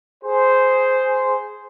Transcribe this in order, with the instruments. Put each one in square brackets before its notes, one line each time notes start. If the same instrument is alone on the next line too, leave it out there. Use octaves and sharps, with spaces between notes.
[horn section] G#4 C5